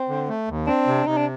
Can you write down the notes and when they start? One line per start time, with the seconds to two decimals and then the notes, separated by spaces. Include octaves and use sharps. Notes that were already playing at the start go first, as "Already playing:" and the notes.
Already playing: C4
0.09 D3
0.29 A3
0.48 D#2
0.67 C4 D4
0.87 C3
1.06 C3 D#4
1.17 D4